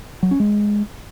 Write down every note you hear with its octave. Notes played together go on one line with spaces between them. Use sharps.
F#3
C#4
G#3